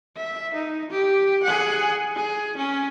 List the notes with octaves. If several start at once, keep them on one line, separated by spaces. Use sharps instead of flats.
E5
D#4
G4
G#4 F#5
G#4
C#4